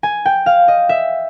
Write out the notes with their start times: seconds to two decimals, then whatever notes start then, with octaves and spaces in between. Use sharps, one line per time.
0.03 G#5
0.26 G5
0.46 F5
0.68 D#5
0.89 E5